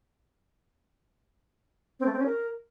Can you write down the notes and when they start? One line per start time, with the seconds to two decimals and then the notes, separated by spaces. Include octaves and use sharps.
2.00 C4
2.06 A3
2.13 C4
2.19 C#4
2.26 A#4